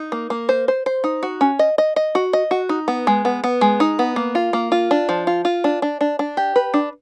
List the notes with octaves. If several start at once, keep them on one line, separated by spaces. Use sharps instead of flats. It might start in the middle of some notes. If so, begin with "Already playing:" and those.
Already playing: D#4
A#3
A#3
C5
C5
C5
D#4
F#4
C#4
D#5
D#5
D#5
F#4
D#5
F#4
D#4
B3
G#3
B3
B3
G#3
D#4
B3
A#3
F4
A#3
F4
D4
F3
F4
F4
D4
D4
D4
D4
G4
B4
D4